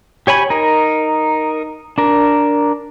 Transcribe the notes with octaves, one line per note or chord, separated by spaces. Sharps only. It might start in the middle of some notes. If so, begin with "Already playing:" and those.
G4 C#5 G#5 B5
D#4 A#4
D4 A#4